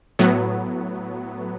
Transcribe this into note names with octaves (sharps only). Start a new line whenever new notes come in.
A2 F#3 B3